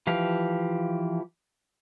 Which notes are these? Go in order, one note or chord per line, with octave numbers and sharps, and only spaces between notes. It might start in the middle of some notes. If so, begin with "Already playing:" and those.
E3 F3 G4 F5